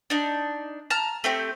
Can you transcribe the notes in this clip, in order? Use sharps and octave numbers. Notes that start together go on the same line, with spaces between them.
D4 D#4
A5 A#5 F6
A3 C4 G4